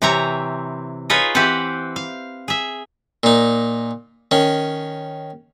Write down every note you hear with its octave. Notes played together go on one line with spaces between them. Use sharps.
C3 E3 C4 C#5 A#5
D#4 F4 G#4 B4 C#5 D#5
E3 C4 G4 B4 C5 F#5
F5
G#4 E5
A#2 D#4
D#3 C#4